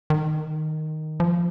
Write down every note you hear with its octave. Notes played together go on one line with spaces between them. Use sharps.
D#3
F3